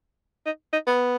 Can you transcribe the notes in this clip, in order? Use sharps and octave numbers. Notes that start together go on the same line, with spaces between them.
D#4
D#4
B3